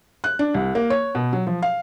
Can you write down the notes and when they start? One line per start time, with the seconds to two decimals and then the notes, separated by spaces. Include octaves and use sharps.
0.24 F#6
0.39 D4
0.54 C2
0.75 A#3
0.90 C#5
1.15 B2
1.33 F#3
1.47 F3
1.62 F5